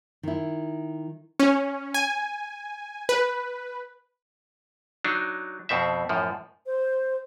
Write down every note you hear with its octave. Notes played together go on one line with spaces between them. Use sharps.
D#3 E4
C#4
G#5
B4
F#3 D4 D#4
F2 B2 C4 E5
F#2 A2 F3
C5